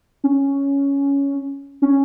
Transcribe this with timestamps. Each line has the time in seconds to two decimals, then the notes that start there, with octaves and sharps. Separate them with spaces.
0.24 C#4
1.82 C#4